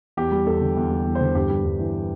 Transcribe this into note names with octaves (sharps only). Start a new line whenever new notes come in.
E2 G4
G3
E2 A4
D3
E2
G3
E2
C5
D3
G2 G4
G3
G2
E3